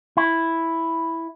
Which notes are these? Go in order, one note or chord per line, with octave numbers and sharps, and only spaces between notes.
E4